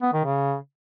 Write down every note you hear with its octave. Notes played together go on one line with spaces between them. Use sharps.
B3
D#3
C#3